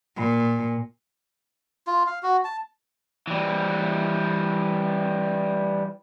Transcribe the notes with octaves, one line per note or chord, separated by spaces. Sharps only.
A#2
F4
F5
F#4
A5
E3 G3